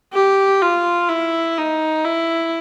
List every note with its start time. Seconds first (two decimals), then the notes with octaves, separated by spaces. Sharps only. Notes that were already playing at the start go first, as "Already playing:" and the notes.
0.13 G4
0.61 F4
1.09 E4
1.57 D#4
2.05 E4